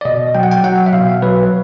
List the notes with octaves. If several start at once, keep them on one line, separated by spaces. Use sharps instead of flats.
D5
B2 D#5
F#3 G5
F#5
G5
F#3 F#5
E5
B2 F5
F#3 B4